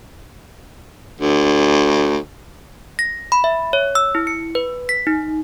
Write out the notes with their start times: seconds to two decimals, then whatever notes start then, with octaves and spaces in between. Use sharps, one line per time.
1.21 D2
2.99 A#6
3.32 B5
3.44 E5
3.73 C#5
3.95 E6
4.15 E4
4.27 C#7
4.55 B4
4.89 B6
5.07 D#4